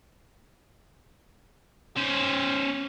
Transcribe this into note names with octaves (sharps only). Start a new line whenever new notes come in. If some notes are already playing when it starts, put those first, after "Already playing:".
C#4 C5